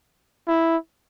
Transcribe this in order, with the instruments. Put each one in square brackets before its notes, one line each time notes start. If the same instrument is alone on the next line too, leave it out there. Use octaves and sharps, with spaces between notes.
[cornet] E4